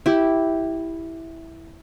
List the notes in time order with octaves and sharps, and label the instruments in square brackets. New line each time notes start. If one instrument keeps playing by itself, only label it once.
[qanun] E4 G4